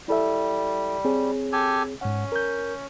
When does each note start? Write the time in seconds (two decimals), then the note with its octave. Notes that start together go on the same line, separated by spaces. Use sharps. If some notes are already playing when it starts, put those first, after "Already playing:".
0.08 G3 E4 A4 E5
1.05 C4 G#4 C#5
1.52 G4 A4 G#5
2.01 G#2 C#4 F#5
2.32 A#4 G6